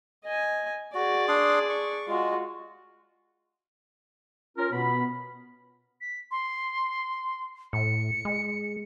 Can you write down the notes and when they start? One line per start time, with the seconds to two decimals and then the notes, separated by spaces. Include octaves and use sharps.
0.25 D#5 G#5
0.94 F#4 G#4 D5
1.28 D4 C6 D#6
1.69 C#6
2.08 G#3 F4 F#4
4.58 C#4 F4 A#4
4.72 B2 B3 B5
6.01 B6
6.31 C6
7.73 A2 C#7
8.25 G#3